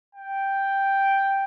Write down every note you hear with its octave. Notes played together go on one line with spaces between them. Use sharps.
G5